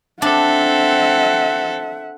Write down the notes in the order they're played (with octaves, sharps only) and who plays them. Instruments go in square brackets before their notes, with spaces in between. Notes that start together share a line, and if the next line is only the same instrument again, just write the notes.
[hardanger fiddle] C4 A4 [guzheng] D4 [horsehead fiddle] E5 F#5